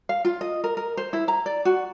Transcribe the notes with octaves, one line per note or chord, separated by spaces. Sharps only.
F5
F4
D#5
A#4
A#4
C5
E4
A#5
D5
F#4